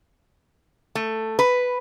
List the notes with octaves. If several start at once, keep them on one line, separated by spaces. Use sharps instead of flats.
A3
B4